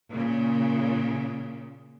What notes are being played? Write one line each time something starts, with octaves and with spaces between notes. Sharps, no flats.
A#2 C#3